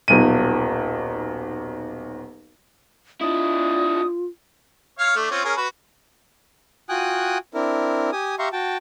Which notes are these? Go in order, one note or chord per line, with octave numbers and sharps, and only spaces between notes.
D#1 B1 D#7
D4 E4 F4 D#6
C#5 F5 F6
A3 D4
C4 C#4 F4
C#4 G#4 A#4
F#4 B4
F4 F#4 G5 G#5 D#6 F#6
C4 D4 E4 A#4
G4 G#5 D#6
G4 E5 F5 A#5 C6 C#6
F#4 G5 A5